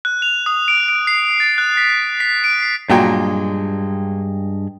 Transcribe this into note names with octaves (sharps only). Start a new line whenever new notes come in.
F#6
F7
D#6
D7
D7
C7
A6
F#6
B6
B6
D7
C7
G2 A#2 F#3 G#3 G5